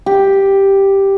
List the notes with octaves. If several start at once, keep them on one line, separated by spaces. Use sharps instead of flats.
G4